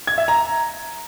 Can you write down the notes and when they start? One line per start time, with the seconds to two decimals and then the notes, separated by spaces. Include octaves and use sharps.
0.07 G#6
0.18 E5
0.28 A#5